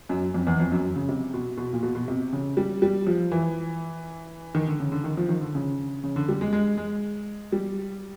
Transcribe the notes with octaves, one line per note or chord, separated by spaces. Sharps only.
F#2
F2
E2
F2
F#2
C#3
C3
B2
B2
A#2
B2
B2
C3
C#3
G3
G3
F3
E3
D#3
D3
C#3
D3
D#3
F3
D#3
D3
C#3
C#3
D3
G3
G#3
G#3
G#3
G3